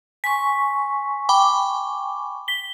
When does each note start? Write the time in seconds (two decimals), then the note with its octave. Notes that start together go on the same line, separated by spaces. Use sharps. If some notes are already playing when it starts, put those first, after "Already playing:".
0.24 G#5 C6 C#6 B6
1.29 G5 B5 D6
2.48 B6 G7